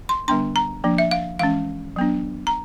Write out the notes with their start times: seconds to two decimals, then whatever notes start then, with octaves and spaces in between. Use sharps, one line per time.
0.09 C6
0.28 D3 G3 B3 D4 C6
0.56 A#5
0.84 F3 A#3 D4
0.98 E5
1.11 F5
1.39 E3 G#3 C#4 F5
1.96 F#3 B3 D4
2.47 A#5